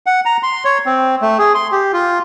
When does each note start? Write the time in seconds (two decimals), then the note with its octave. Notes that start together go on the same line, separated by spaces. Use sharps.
0.06 F#5
0.25 A#5
0.43 C6
0.65 C#5
0.86 C4
1.22 A3
1.39 G#4
1.55 C6
1.72 G4
1.93 F4